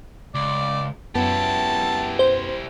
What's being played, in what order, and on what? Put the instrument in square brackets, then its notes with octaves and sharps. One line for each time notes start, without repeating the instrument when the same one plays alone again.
[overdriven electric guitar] C#2 [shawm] D5
[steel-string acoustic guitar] F#2 B3 [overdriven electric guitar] E4 G4 [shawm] A5
[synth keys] C5